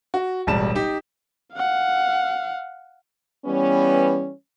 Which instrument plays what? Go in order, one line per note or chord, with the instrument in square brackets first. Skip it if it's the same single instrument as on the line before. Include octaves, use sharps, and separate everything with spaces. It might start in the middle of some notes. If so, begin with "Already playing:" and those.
[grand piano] F#4
E1 A1 G3 A5 E7
D#4 G4
[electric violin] F5 F#5
[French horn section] E3 G3 B3 C#4